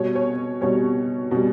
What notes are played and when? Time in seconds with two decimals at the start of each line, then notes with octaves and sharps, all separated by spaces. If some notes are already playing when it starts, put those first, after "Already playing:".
Already playing: B2 G3 C#5
0.15 C#5
0.61 B2 G3 C#5
1.31 B2 G3